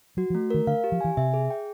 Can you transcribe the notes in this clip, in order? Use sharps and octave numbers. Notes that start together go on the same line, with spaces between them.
F#3 F#4
F3
A3
D#3 A#4
D3 F5
G4
F3
E3 G#5
C3 E5
G#4
G5